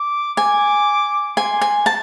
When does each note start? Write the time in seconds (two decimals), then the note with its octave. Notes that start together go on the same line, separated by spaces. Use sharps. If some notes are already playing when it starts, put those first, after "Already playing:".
Already playing: D6
0.37 G#5 D6
1.37 G#5 C6
1.61 G#5
1.86 A5